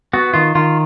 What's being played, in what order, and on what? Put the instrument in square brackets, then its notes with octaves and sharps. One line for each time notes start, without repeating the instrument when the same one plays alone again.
[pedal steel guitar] B3 F#4
D#3 F4
D#3 F4